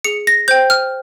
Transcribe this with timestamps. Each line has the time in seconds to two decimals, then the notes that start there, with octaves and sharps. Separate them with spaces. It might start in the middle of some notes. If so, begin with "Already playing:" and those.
0.04 G#4 C#7
0.27 A#6
0.48 C5 G5 G6
0.70 F6